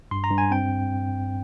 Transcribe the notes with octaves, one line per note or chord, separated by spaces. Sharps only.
G2 C6
A#5
G2
G#5
C4 G5